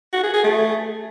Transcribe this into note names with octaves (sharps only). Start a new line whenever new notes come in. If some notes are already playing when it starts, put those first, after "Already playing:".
F#4
G#4
G#4
A3